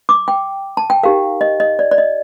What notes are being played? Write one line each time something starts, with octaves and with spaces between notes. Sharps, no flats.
D6
G5
A5
G5
D#4 G4 A#4 F5
D#5
D#5
D5
D5
D#5